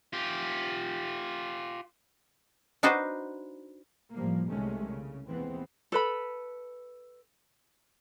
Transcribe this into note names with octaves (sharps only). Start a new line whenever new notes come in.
F4 G4
D4 D#4 F#4 B4 C5
A1 A2 F3 G3 A#3
C2 C3 D#3 G#3 A3 C#4
C#3
D#2 E3 G#3 B3 C4
A4 B4 B5